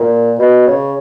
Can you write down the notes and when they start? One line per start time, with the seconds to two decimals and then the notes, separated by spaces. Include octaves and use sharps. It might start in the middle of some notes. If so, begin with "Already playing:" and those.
Already playing: A#2
0.39 B2
0.67 C#3